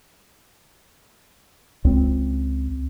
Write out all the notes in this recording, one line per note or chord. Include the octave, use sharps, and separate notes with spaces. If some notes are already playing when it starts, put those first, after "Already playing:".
C#2 C4